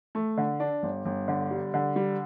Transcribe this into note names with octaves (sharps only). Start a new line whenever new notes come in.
A3
D3
D4
G1
G1
D3
G3
D3
G3